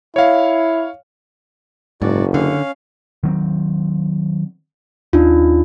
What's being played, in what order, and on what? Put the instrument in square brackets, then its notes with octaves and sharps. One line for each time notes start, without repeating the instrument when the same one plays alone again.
[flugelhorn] E4 [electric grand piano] C#5 F5
[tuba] F#1 [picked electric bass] G#2 [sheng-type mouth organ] F#4 D5
[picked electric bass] D3 [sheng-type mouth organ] C#4 F5
[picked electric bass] D#3 F#3 C4
[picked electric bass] D#2 [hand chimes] D4 D#4 F4